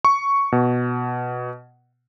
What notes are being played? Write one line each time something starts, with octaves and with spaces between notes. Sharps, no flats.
C#6
B2